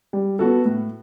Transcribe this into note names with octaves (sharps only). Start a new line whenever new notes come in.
G3
B3 F#4 A4
A2